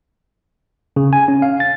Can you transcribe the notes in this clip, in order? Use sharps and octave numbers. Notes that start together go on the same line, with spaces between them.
C#3
G#5
C#4
F5
A6